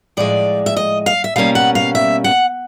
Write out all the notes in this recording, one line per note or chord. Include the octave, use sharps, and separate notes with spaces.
A2 F3 G#3 D5
E5
D#5
F5
E5
B2 G3 A#3 C#4 F5
F#5
F5
E5
F#5